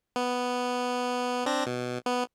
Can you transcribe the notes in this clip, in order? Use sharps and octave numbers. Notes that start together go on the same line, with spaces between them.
B3
C4 D4 A#6
B2
B3